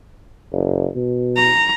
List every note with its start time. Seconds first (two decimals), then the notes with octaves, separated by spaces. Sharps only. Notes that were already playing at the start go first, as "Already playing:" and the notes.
0.52 F#1
0.95 B2
1.36 A#5